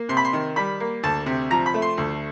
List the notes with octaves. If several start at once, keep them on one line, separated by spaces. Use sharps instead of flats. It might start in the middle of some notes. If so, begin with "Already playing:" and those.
Already playing: A#3
C3 C6
B5
C6
D#3
G3 B5
A#3
D2 A5
C3
F3 A#5
B5
A3
C6
D2